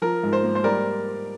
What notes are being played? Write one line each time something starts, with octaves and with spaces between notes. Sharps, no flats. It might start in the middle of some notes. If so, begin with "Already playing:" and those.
F3 A#4
G#2
C5
A#3
C5
G3 A#4 D5